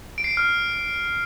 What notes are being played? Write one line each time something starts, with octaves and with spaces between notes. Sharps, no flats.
D7
C7
D7
F6